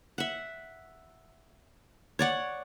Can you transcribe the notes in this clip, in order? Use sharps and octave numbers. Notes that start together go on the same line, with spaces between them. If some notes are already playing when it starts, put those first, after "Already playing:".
E5 F#5
C#5 D5 F#5